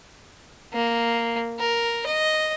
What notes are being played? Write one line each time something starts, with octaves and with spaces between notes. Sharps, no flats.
A#3
A#4
D#5